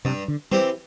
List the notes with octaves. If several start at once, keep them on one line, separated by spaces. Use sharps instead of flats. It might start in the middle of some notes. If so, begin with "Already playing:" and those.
G2 C3
D3
E3 G3 C4 G4